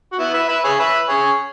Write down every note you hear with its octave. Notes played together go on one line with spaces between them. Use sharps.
F#4
B3 E4
B4 E5
B4 E5
G#4 C#5
B4 E5
G#4 C#5